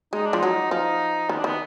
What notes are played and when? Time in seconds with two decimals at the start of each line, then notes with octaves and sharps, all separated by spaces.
0.13 G#3 D#4
0.26 D4
0.33 F3
0.38 F#3 D#4
0.71 F3 D#4
1.29 D#3 B3
1.38 D4
1.44 D#3 B3